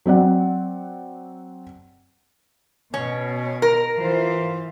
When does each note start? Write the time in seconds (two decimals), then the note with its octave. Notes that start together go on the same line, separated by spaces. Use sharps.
0.06 F#3 C4 D5 F#5
2.94 B2 C#4
3.62 A#4
3.97 E3 F4 C5